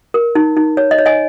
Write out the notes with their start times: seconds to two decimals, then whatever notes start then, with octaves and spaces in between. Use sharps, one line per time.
0.14 A#4
0.35 D#4
0.57 D#4
0.77 C#5
0.91 D#5
0.98 C#5
1.06 D#5 G#5